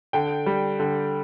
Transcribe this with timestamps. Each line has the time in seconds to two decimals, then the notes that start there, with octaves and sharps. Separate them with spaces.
0.13 D3 G5
0.46 G3
0.80 D3